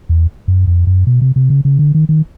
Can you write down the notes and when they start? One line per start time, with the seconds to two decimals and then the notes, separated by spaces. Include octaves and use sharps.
0.09 E2
0.48 F#2
0.67 F2
0.87 F#2
1.07 B2
1.22 C3
1.36 C3
1.50 C#3
1.65 C#3
1.79 D3
1.94 D#3
2.09 D#3